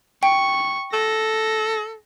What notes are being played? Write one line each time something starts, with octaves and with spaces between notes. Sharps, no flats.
G5 C#6
A4 A#6